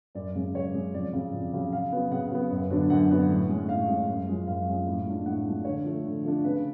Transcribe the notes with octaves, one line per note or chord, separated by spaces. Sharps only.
F#2 D5
C#3 G#3 C#4
F#2 C#5
C#3 G#3 C#4
F2 D5
C#3 F#3
F2
C#3 F#3
C#3 F5
F#3 B3
C#3 F#5
F#3 B3
F#2
D3 F#3 B3 D4
F#2 F#5
D3 F#3 B3 D4
A2
G#3 C#4
A2 F5
G#3 C#4
F#2
F3 G#3 C#4
F#2 F5
F3 G#3 C#4
A2
F3 G#3 D4
A2 F#5
F3 G#3 D4
D3 C#5
F3 A3 D4
D3
F3 A3 D4
C#3 B4